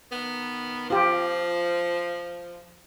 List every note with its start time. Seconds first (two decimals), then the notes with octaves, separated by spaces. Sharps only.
0.12 D#3 B3
0.90 F3 F4 G4